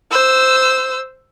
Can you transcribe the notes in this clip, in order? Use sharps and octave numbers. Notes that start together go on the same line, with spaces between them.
C5 E6